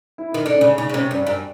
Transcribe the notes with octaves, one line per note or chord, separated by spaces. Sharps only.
E4
D#3 D#4
D3 D4
C#4
C#3 D4
C#3 D#4
C#3
C3 C#4
G2 C#4
F#2 D4